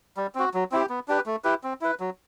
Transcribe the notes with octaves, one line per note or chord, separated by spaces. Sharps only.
G3
C4 F#4
F#3
C4 E4 G4
B3
D4 G4 B4
A3
E4 G4 B4
C4
E4 B4
F#3